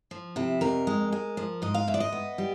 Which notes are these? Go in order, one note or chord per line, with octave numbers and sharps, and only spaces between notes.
F3
C3 E4
F2 A#4
G#3
G#3
F3
G#2 D#5
F5
G#2 E5
D5
D#5
B3
G3